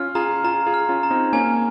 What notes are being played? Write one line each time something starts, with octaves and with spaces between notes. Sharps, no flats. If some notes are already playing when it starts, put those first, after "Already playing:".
Already playing: C#4 F4 F6
F4 G#4 A#5
F4 G#4 A#5
F4 G#4
F6
C#4 F4
A#5
C4 D#4
A#3 C#4 G#5